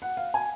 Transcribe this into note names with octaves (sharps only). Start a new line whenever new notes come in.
F#5
F5
G#5